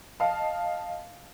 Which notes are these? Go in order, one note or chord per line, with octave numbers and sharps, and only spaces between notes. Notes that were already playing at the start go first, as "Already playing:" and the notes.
D#5 F5 A5